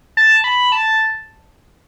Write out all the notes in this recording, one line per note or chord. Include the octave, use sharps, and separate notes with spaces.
A5
B5
A5